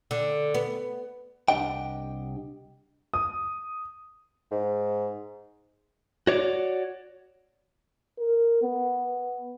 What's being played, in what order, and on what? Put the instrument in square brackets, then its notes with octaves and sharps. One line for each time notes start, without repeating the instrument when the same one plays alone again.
[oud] D3
B3
[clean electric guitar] C2 D4 G4 D#5 F#5 G5
[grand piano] D#6
[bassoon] G#2
[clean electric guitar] F#4 C#5 D5
[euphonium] A#4
B3